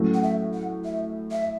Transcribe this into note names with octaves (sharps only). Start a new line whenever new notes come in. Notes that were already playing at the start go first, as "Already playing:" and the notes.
Already playing: A2 F#3 A3 C#4
F#5
E5
F#5
E5
E5